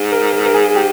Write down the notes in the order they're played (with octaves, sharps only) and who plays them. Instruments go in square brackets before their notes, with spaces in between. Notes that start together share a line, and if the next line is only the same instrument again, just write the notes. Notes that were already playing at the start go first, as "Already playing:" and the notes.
Already playing: [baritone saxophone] G#2
[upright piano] A#4
A#4
A#4
G#4
G4